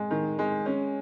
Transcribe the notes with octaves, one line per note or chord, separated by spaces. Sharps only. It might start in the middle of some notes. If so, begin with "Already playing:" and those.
Already playing: G#3
D#3
G#3
C#4